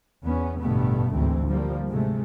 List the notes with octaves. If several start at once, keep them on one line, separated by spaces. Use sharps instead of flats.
E2 B3 C#4
A1 G2 B2 D3 A3 B3
A1 D2 G#2 E3 C4
D3 F3 G3 A#3
G#2 C3 G#3 A3